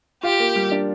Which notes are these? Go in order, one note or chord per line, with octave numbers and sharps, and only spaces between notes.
F4 G4
A#3
G3
D4